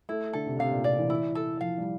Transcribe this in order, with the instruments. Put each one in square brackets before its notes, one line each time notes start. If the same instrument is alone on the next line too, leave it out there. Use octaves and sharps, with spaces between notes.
[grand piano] A3 [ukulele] E4
[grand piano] D3 [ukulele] A4
[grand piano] C3
[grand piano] C3 [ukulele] F5
[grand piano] A#2
[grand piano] C3 [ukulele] D5
[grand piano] E3
[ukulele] E4
A4
[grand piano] F3 [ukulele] F5
[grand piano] G3